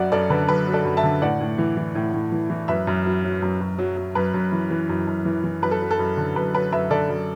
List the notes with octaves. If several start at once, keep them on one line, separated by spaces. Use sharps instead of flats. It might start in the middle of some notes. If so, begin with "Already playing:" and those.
Already playing: F#2 F#3 B4 D5 E5 F#5
F#2 A4 D5
D3 B4
F#2 B4
F#3
A4 D5
F#2
E5 A5
D3
A2 D5 F#5
A2
E3
E3
A2
A2
E3
E3
F#2 B4 E5
F#2
F#3
F#3
F#2
F#2
F#3
F#3
F#2 B4
F#2
E3
E3
F#2
F#2
E3
E3
F#2 B4
A4
F#3
A4
F#2
D3
F#2 B4
F#3 B4
F#2 B4 E5
D3 A4 D5
F#2